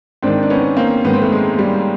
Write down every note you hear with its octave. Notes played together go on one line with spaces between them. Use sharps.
G#2 D#3 C4 D4
D4
B3 C#4
A#3 C4
G#2 D#3 B3
C4
A3 B3
G#3
G3